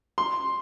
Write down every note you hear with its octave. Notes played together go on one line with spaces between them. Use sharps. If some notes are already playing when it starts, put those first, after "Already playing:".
C6